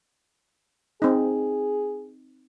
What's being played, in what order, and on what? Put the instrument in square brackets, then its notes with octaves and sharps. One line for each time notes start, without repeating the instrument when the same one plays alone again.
[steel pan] C4 D#4 [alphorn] G#4